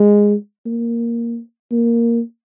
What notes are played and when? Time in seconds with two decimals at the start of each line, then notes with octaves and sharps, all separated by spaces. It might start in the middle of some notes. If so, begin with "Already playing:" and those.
Already playing: G#3
0.66 A#3
1.72 A#3